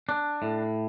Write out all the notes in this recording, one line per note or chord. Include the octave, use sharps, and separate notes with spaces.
D4
A2